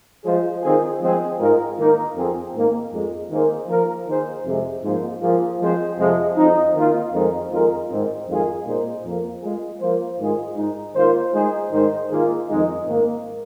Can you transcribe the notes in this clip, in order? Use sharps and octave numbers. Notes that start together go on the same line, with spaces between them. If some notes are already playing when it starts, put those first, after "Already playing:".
F3 G#3 F4 G#4 C5
D#3 C4 F4 G#4
F3 G#3 C4 G#4
G#2 G#3 F4 A#4
D#3 A#3 D#4 A#4
F2 F3 C4 G#4
G#2 D#3 A#3
F2 F3 G#3
D#3 A#3 G#4 C5
F3 A#3 F4 A#4
D#3 A#3 G#4 C5
F2 C3 G#3
G#2 F3 A#3 G#4 C5
F3 A#3 F4 G#4
F3 G#3 C4 G#4 C5
F2 C3 F3 G#3
F2 F3 C4 D#4
D#3 A#3 F4
F2 D#3 G#3 C4 D#4
F2 D#3 G#3 F4 A#4
G#2 D#3 G#3 C4
F2 D#3 G#3 F4 G#4
A#2 A#3 D#4 G#4 C5
F2 F3 A#3
G#3 F4 G#4
F3 A#3 F4 C5
G#2 D#3 G#3 F4 G#4
G#2 G#3 D#4
D#3 A#3 F4 C5
G#3 D#4 G#4 C5
G#2 D#3 G#3 D#4 C5
D#3 A#3 F4 G#4
F2 D#3 G#3 D#4
G#2 D#3 A#3